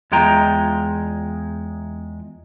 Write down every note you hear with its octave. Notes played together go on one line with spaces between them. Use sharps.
E2 G#3 F4 G5 A#5